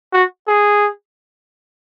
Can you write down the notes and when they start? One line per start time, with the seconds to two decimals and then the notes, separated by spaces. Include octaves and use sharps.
0.13 F#4
0.48 G#4